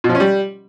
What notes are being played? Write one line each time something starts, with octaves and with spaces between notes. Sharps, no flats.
B2
F3
C#4
G3